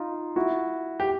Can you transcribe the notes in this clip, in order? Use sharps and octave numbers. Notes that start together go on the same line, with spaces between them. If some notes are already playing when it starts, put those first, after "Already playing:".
Already playing: D#4 F4
E4 F#4
G4